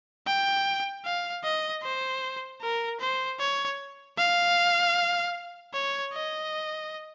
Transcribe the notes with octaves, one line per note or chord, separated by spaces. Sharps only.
G5
F5
D#5
C5
A#4
C5
C#5
F5
C#5
D#5